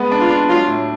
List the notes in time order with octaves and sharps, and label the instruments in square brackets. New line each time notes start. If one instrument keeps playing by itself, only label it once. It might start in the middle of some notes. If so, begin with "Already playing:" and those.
Already playing: [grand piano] G#3 B3
D4
[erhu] F4
[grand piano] D4
[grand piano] F#3 [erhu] F4
[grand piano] A2